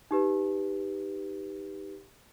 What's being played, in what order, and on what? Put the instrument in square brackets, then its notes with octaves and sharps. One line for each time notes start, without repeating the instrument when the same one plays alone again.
[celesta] D#4 G4 B4